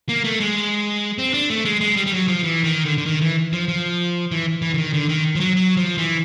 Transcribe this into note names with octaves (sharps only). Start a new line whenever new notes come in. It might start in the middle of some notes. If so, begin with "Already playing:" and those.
A#3
A3
G#3
C4
D4
A3
G#3
G#3
G3
G3
F#3
F3
E3
D#3
D3
D3
D#3
E3
F3
F3
E3
E3
D3
D#3
D3
D#3
F3
F#3
F#3
F3
E3